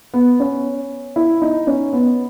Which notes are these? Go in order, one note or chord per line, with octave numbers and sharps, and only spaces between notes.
B3
C#4
E4
D#4
C#4
B3